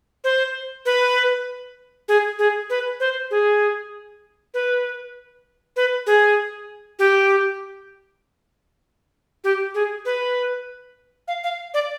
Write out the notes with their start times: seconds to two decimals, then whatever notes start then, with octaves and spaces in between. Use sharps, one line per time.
0.24 C5
0.86 B4
2.08 G#4
2.39 G#4
2.70 B4
3.00 C5
3.31 G#4
4.54 B4
5.76 B4
6.07 G#4
6.99 G4
9.44 G4
9.75 G#4
10.05 B4
11.28 F5
11.44 F5
11.74 D5